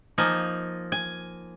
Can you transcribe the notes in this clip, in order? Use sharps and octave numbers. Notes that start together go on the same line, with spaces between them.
F3 A#3 D#4 G#5
G#5